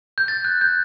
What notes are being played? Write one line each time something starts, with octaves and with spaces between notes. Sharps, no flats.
G6
A6
F#6
G6